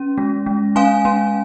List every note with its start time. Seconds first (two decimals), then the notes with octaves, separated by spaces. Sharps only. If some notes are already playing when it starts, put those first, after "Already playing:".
Already playing: C#4
0.18 G#3
0.46 G#3
0.76 C#4 F5 G#5
1.05 C#4